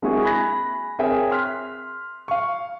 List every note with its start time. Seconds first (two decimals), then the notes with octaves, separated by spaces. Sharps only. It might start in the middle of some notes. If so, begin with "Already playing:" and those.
0.02 G#3 A#3 C4 E4 F#4 G#4
0.23 G#5 B5 F#6 A#6
0.99 C4 G#4 A#4 C#5 E5 G5
1.31 C6 F6 F#6 B6
2.28 F5 C#6